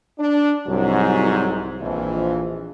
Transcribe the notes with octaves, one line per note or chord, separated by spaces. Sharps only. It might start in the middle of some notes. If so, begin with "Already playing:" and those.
D4
C2 G#2 F#3
A#1 F2 E3